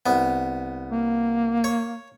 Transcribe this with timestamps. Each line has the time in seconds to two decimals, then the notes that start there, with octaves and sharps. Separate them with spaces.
0.06 C2 B3
0.92 A#3
1.64 C#5